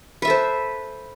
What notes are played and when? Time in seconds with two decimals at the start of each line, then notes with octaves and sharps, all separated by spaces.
0.22 B4
0.25 E5
0.27 A4
0.30 C5